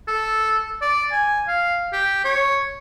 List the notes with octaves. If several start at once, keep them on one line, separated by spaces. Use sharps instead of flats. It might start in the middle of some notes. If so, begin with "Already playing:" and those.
A4
D5
G#5
F5
G4
C#5